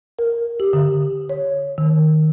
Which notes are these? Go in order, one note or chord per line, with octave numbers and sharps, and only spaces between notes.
A#4
G4
D3
C#5
D#3